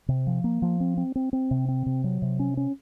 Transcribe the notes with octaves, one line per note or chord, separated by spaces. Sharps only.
C3
F3
A#3
F3
C4
C4
C4
C4
C3
C4
C3
F#3
C3
C#4
C#4